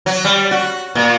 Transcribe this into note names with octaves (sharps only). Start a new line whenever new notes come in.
F#3
G3
F#4
A#2